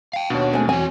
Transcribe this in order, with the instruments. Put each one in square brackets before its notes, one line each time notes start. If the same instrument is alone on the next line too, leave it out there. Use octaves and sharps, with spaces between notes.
[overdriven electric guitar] F5 G5
[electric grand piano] D#2 B2 [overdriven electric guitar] D4 [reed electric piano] C#5 F#5
[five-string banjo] G#3 G#5 [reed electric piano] A3 C4
[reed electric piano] E2 E3 F#4 [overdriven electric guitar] C4 C#5 [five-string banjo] G#5